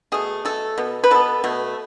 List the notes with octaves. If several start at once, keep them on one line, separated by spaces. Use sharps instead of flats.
B2 A3 G#4
B2 A3 A4
B2 B3
B4
B2 B3 A4
B2 A3